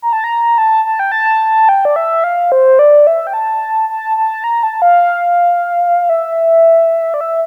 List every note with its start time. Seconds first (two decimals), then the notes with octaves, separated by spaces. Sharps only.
0.02 A#5
0.13 A5
0.24 A#5
0.58 A5
0.85 A5
0.99 G5
1.12 A5
1.69 G5
1.85 D5
1.96 E5
2.24 F5
2.52 C5
2.79 D5
3.07 E5
3.27 G5
3.34 A5
3.89 A5
4.17 A5
4.44 A#5
4.63 A5
4.82 F5
6.09 E5
7.14 D5
7.21 E5